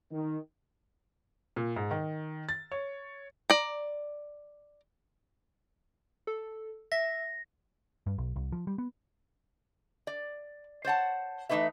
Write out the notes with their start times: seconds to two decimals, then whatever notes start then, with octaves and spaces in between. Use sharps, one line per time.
0.12 D#3
1.56 A#2
1.76 G#2
1.91 D#3
2.49 A6
2.72 C#5
3.50 D5 A#5
6.27 A4
6.92 E5 A#6
8.06 G2
8.18 B1
8.36 C2
8.52 F3
8.67 G3
8.78 B3
10.07 D5
10.85 C5 C#5 F#5 A5
11.49 E3 A3 C#4 D#4 B4 E5